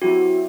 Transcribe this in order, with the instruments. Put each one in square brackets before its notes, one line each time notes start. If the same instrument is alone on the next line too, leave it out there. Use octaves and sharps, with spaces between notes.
[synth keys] F#3 C4 E4 G4 [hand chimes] F#4